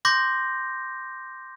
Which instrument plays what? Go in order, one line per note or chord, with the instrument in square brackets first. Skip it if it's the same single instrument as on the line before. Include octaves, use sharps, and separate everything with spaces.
[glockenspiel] C6 D6 G6 A#6